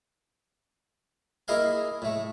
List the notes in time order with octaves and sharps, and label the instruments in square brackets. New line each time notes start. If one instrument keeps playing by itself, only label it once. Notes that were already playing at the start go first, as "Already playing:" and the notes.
[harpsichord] A#3 E4 G#4 D#5 F5 G#5
A2 A3